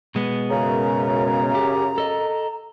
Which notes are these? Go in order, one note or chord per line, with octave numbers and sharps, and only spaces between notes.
B2 G#3 B3
F#2 C#3 A#5
G4
A4 D#5